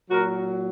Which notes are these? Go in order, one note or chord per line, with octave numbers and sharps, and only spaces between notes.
A#2 F#3 F#4 A#4